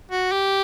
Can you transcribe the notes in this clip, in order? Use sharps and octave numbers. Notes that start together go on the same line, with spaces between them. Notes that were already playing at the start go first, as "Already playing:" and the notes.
F#4
G4